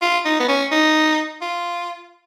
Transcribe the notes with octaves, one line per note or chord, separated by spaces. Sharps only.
F4
D#4
B3
C#4
D#4
F4